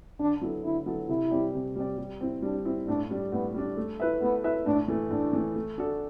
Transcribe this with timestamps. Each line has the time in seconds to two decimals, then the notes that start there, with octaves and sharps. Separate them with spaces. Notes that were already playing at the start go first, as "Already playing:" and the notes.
0.19 D3 D4
0.41 F#3 B3 E4 A4
0.64 D3 E4
0.86 F#3 B3 E4 A4
1.08 C3 E4
1.31 G3 C4 G4 D5
1.54 C3
1.76 G3 C4 G4 D5
1.98 G3
2.21 C4 E4
2.42 G3 D4
2.65 C4 E4
2.88 A2 D4
3.11 G3 D4
3.32 A2 B3
3.54 G3 D4
3.77 A3
4.00 E4 B4 E5
4.21 A3 B3
4.44 E4 B4 E5
4.66 A2 D4
4.88 E3 A3
5.11 A2 D4
5.33 E3 A3
5.56 A3
5.78 D4 F#4 A4